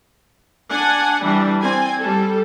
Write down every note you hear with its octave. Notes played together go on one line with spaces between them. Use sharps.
D4 F#5 G#5
E3 G3 D4
C4 D5 G#5
G3 A4